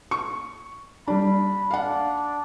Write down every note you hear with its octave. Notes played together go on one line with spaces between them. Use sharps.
C#6
G3 D4 B5
D4 F5 F#5